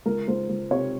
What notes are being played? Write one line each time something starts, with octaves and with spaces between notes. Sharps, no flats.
C#2 A#4
C#2 C5
C#2
C3 C#5